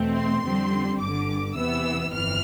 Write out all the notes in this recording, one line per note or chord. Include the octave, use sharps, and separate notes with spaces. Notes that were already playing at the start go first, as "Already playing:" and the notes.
Already playing: E2 B2 A3 C4
C6
F2 D3 G3 C4
G1 G2 D3 D6
E2 C3 E3 B3 E6
G1 F2 E3 F6